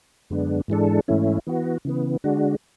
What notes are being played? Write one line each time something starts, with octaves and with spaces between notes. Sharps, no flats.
F#2 D3 G#3 B3 D4
G#2 E3 G#3 D4 A4
G#2 E3 A3 C#4 E4
E3 B3 F#4
C#3 E3 B3
D3 G#3 D4 F#4